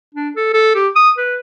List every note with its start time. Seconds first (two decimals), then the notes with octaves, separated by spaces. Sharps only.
0.15 D4
0.36 A4
0.54 A4
0.75 G4
0.96 D#6
1.18 B4